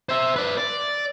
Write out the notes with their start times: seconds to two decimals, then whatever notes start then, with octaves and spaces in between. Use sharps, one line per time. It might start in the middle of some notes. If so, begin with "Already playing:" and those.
0.09 C5 E5
0.36 B4 D5
0.57 D5